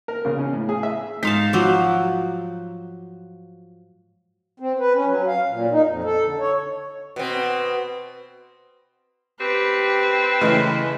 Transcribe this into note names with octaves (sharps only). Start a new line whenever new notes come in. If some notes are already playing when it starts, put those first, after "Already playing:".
A#4
C#3
C#4
A2
G#4
E5
G#2 G#3 D#4 F5 A5
F3 F#3 D6 E6
C4
B4
C#4
F#3
F5
A#2
D#4
F2
A4
D3
C#5
B2 C4
C4 G4 B4
C#3 E3 G#3 A3